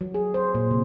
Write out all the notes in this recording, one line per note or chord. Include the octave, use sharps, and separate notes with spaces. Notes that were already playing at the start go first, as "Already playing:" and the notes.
F#3
G#4
C5
A#2
C3